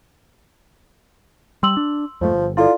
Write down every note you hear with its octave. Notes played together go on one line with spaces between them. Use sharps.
G3 C6 E6 F#7
D4
F2 G#2 F3 A3
G1
E4 F4 A4 D5